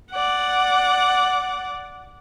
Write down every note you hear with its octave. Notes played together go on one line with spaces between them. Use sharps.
D5 F#5